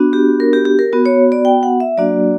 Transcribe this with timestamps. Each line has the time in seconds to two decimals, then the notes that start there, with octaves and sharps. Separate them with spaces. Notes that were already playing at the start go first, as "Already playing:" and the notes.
Already playing: B3 D4 F#4
0.13 G4
0.40 A#4
0.53 G4
0.65 G4
0.79 A#4
0.93 B3 F#4
1.06 C#5
1.32 D5
1.45 G5
1.63 F#5
1.80 E5
1.97 F#3 A#3 D4 F#4 D5